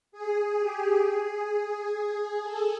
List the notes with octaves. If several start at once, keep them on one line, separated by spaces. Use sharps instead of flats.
G#4
G4
G#4
A4